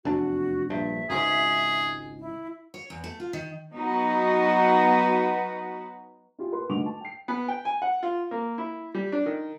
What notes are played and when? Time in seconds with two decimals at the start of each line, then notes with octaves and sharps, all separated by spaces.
0.05 F1 E2 D4 F#4
0.70 A#1 G2 E5
1.10 G#1 C#2 G#2 G#4
2.20 E4
2.74 C#5
2.90 E2
3.04 A3
3.20 F4
3.33 D#3
3.74 F#3 B3 D#4 F#4 B4
6.39 E4 F4 G4 G#4
6.52 A#4 B4 C6
6.69 D2 G2 D#3 C#6 D6 F7
6.86 A5
7.01 G5 C7
7.28 B3
7.48 G5
7.65 G#5
7.82 F#5
8.03 F4
8.31 A#3
8.58 E4
8.94 G3
9.12 D4
9.26 D#3